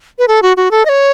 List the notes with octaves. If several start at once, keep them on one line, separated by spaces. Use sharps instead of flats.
B4
A4
F#4
F#4
A4
D#5
C#5